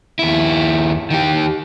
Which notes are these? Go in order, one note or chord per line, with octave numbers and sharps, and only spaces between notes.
D#2 E4
D#3 G4